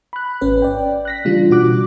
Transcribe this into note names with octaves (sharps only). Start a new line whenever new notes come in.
B5 F#6
G#1 C#4 B4
D5 G5
F#6 A#6 B6
C#3 E3 G3 D4 F4
B2 F#4 D6 F#6